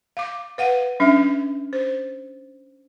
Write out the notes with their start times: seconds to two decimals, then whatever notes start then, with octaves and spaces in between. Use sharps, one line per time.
0.17 F5 D6
0.58 B4 F5 F#5
1.00 F#3 C#4 D4 E5
1.73 C5